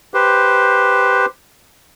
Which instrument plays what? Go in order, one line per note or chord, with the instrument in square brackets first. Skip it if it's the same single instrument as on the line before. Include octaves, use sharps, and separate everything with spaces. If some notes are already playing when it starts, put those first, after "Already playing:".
[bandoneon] G4 B4 C5